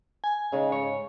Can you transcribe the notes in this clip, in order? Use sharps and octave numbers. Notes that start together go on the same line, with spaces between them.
G#5
C#3 G#3 D#4
G#2 C#5